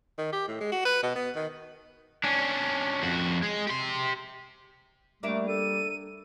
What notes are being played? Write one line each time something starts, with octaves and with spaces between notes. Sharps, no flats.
D#3
G4
A2
G#3
F#4
B4
B2
B3
D#3
C#4 D4
F2 F#4
G#3
G4 C6
G3 A3 A#3 D4 E5 D6
A4 D#7